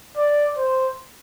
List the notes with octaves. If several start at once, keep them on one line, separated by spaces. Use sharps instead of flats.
D5
C5